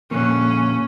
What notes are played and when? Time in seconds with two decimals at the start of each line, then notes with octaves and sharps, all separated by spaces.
0.11 A#2 D3 F3 A#3 C#4 F#6